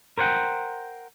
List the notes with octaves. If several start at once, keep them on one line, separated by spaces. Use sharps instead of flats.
A#4 C5 C#5 F#5 G5